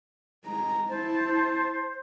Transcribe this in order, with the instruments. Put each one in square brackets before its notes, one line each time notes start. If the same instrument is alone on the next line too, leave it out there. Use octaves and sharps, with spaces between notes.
[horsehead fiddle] G#3 A#5
[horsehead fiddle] E4 A5 [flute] C5